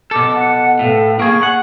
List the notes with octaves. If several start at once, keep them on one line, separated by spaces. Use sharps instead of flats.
B2 A4 D6
F#5
A2 A4 B4 F5
A#3 G#4 C#6
F#5